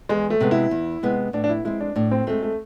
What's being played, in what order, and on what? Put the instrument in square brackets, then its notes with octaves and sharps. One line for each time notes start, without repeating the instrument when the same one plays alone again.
[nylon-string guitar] E2 [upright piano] G#3
[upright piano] A3
[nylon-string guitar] C3 G#3 B3
[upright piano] E4
[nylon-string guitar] E2
C3 G#3 B3
[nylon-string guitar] A2 [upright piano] D4
[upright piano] D4
E4
[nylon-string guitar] G#3 C4 [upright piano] E4
[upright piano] D4
[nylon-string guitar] A2 [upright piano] D4
[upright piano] C4
[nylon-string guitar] G#3 C4 [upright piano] A3
[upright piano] A3